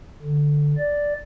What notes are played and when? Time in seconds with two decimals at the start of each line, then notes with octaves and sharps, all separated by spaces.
0.22 D3
0.78 D5